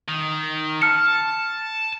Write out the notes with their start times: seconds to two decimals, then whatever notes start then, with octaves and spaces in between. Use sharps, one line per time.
0.09 D#3
0.82 A5 F6 C#7